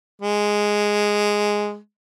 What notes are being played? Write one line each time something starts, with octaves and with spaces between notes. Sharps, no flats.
G#3